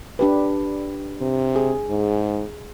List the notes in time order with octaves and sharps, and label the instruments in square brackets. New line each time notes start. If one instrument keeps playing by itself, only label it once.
[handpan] D4 G4 B4
[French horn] C3
[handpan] G#4
[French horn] G#2